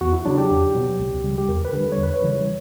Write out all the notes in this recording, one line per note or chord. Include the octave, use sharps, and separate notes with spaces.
E2 F#4
E4
C#3 F#3 D4
G4
E2
B2 F#3
C#2
C#3 G3
G4
E2 A#4
B4
D3 G3
C#5
E2
B4
C#5
C#3 E3 G3